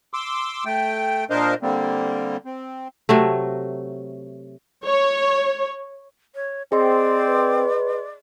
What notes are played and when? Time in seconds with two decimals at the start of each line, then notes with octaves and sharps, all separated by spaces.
0.13 C6 D6 E6
0.65 A3 G5
1.30 A#2 D4 A#4 C5 D#5 F5
1.62 D3 G3 A#3 C4
2.45 C4
3.09 C3 F#3 A3
4.84 C#5
6.35 C#5
6.72 C4 G#4 D5 D#5 C6
7.28 B4